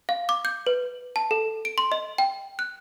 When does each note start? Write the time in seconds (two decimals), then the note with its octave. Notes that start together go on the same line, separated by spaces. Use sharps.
0.09 F5
0.29 D6
0.45 G6
0.67 B4
1.16 A5
1.31 A4
1.65 D7
1.78 C6
1.92 D#5
2.18 G5
2.59 F#6